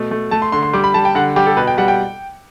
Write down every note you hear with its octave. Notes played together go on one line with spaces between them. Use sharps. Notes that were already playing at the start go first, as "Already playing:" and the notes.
Already playing: B2 A3
A3
A3 A5
C6
D3 C6
C6
G3 D6
B5
G3 A5
G5
D3 F#5
G3 G4
A4
B2 B4
G5
G3 F#5
G5